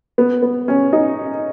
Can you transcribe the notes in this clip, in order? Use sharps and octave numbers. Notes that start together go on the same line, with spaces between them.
B3
B3
C#4
D#4